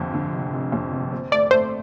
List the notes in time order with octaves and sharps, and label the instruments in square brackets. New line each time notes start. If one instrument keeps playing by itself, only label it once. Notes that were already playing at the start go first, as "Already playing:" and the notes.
Already playing: [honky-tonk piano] F1 F2 D3
D3
F1
F1
F2
F1
C4
[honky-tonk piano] A3 [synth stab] D5
[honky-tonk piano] A3 [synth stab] C5